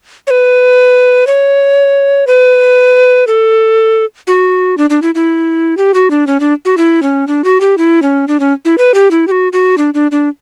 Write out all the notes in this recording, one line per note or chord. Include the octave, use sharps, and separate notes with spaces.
C#5
B4
C#5
B4
A4
F#4
D4
D4
E4
E4
G4
F#4
D4
C#4
D4
F#4
E4
C#4
D4
F#4
G4
E4
C#4
D4
C#4
E4
B4
G4
E4
G4
F#4
F#4
D4
D4
D4